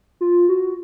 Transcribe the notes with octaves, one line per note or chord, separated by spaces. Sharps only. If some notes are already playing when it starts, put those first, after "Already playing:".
F4
F#4